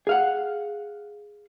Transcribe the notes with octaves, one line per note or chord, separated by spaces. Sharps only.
G#4 F5 F#5